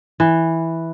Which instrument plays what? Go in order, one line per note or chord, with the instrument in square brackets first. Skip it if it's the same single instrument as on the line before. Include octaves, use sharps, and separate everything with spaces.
[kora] E3